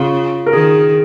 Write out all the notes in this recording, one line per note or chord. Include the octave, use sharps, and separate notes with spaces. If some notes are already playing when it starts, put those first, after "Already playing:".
Already playing: C#3 F4
A#4
D#3 G#4